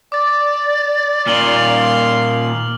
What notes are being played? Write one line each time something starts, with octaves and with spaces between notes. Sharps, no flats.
D5 D6 A6
A#2 D#3 F5 C6 F6 F#7 G7